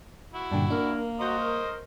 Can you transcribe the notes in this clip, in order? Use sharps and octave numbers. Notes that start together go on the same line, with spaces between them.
E4 F#4
G2 A#2 D3 D4 G5
A#3 D4 A#4
F#4 C5 D#5 A#5 C#6 G6
A#4